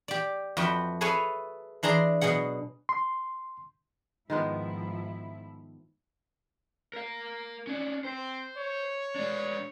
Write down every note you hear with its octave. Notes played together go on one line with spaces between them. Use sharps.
G4 D5
F2 F#4 B4 E5 G5
G#4 A4 B4 C#5 E5 G#5
E3 D4 G#4 A#5 C6
B2 F#3 G#4 F#5
C6
G#2 D#3 F3 G#3 B3 E4
A#4 F5
C#4 D4
C4 C5
C#5
G#3 D4